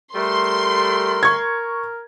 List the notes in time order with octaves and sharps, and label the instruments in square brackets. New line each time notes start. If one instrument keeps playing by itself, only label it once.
[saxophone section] G3 A3 [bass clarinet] A#4 [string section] C6
[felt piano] C#6 G#6